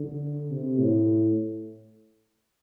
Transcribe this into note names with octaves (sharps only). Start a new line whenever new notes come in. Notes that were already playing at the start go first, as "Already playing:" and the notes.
Already playing: D3
C3
A2